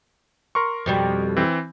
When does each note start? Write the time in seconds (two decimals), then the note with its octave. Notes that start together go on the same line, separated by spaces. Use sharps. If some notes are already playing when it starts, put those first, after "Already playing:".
0.55 A#4 C6 C#6
0.86 F2 B2 G3
1.37 E3 C4